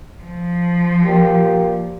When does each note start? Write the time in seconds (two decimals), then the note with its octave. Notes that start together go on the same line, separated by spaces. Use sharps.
0.23 F3
1.04 A#2 G4